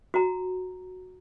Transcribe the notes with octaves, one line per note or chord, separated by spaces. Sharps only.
F#4 A#5